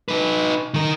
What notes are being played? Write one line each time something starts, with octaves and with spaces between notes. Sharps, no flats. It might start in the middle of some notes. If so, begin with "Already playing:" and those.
D#4 B4
D#3 A#4